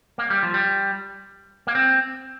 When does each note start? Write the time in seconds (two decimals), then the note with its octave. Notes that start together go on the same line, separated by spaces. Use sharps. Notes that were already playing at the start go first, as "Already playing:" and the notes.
0.18 A#3
0.30 G3
0.43 F3
0.54 G3
1.67 A#3
1.75 C4